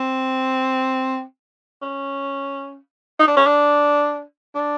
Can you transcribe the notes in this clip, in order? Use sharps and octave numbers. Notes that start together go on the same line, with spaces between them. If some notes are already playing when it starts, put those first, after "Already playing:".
Already playing: C4
C#4
D#4
D4
C#4
D4
D4